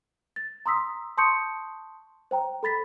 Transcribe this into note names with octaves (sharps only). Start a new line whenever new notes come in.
A6
A#5 C6 D#6 E6 B6
A5 C6 C#6 D#6 G6 C#7
C5 G5 A#5
A4 B5 A6 B6